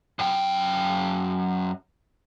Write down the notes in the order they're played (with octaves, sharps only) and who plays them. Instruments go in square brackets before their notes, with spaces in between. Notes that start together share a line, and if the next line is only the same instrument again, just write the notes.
[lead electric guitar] F#2 G5